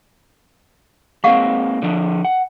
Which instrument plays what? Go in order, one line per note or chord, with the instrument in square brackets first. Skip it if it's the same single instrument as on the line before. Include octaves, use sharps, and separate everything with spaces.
[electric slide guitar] G#3 A#3 C4 [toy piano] F5 F#5 C#6
[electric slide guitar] D3 F3 D4
F#5